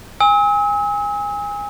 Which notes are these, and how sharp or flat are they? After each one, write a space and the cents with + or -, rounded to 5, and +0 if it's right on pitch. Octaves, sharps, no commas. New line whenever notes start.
G#5 -25 E6 -45